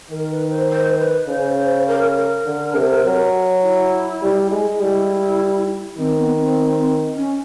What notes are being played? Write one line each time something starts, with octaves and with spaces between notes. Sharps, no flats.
D#3 A#4
B4
C5
C5
C5
B4
C#3 C5
C5
A#4
A#4
D3
C3
F#3
E4
G3
G#3
G3 E4
D#3 C4
B3
C4
C#4